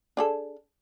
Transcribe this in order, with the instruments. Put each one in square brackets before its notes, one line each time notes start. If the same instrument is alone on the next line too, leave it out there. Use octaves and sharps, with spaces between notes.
[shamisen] D4 G#4 A4